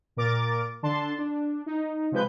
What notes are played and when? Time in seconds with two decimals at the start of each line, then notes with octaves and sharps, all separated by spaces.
0.17 A#2 A#4 D6 A6
0.83 D3 D4 A5 C6
1.18 D4
1.66 D#4
2.12 C3 F3 G#3 B4 G6